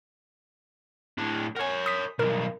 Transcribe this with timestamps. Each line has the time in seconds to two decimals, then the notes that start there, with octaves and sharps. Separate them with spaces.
1.18 A2 D4
1.56 A#4 C#5 F#5 G#5
1.86 D#6 B6
2.19 B1 G2 A#4